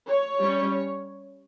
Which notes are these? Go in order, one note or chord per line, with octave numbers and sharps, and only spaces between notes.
C#5
G3 C#4